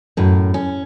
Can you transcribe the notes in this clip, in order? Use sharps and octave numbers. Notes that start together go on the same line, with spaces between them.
F#2 A2
C#4